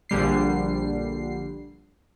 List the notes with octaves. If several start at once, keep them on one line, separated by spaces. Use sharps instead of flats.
A#1 D3 G3 C7